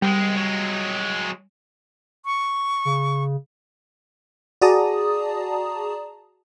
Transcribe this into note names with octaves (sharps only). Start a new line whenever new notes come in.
C2 G3 G#3
F#3 G#3
C#6
C#3
F#4 G#4 D5 A5 A#5 D#6